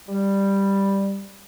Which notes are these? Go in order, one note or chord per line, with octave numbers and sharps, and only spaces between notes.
G3